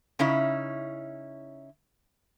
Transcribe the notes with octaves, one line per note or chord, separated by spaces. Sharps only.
C#3 C#4 D#4 E4